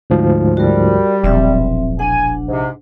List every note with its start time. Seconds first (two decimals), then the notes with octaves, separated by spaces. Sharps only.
0.10 D2 G#2 F3
0.57 G3 F#4 A#4
1.24 E1 A#1 F#3 C4 E5
1.99 D4 F#5 G#5
2.48 G#2 C3